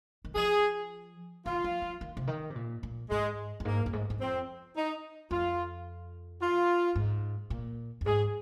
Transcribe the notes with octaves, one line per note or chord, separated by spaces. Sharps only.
D#3
F3 G#4
D#3 F4
F3
F3
D#3
C3
D#3
C3
A#2
A#2
G#2 G#3
F2
G#2 A#3
F2
G#2
G#2
F2 C4
D#4
F2 F4
F4
G#2
A#2
F2
G#2 G#4